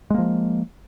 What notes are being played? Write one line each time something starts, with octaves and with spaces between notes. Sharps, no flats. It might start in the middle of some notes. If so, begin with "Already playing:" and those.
F3 G#3 A#3